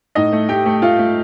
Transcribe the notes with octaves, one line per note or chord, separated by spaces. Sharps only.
A2 D#4 D#5
A3
A3 G4 G5
A3
A3 F4 F5
A3